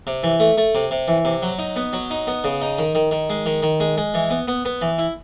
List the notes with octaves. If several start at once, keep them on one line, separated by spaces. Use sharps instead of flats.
C3
E3
A3
A3
C3
C3
E3
C3
F#3
D#4
B3
F#3
D#4
B3
C#3
D#4
D#3
D#3
D#3
G#3
D#3
D#3
G#3
G#3
E3
B3
B3
B3
E3
E4